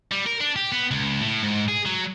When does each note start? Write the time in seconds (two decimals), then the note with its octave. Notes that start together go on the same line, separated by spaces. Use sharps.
0.12 G3
0.27 A#4
0.41 D4
0.56 G4
0.72 B3
0.91 C#2
1.21 A2
1.43 G#2
1.68 G#4
1.85 F#3